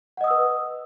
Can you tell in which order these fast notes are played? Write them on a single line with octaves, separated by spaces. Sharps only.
F#5 D#5 D#6 E6 B4